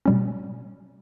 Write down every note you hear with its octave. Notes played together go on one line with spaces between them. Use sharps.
B2 G3 C#4